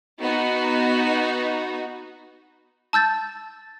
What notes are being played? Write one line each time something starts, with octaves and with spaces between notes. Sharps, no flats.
B3 D#4 F#4
A5 E6 G6 A6